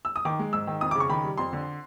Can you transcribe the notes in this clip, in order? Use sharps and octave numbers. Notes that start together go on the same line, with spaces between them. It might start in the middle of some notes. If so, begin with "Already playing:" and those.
E6
D#6
D#3 D6
G#3
G#2 E6
D#3
F2 D#6
D6
C#3
C#6
D#3 B5
G3
F2 C6
D3